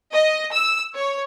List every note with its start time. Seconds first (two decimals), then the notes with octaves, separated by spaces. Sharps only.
0.12 D#5
0.52 E6
0.94 C#5